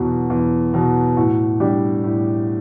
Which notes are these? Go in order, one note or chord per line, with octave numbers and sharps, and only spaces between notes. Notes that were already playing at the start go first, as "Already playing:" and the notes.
Already playing: E2 B2 F#3
E2
B2 F#3
A2 F#4
G3 D4 G4
A2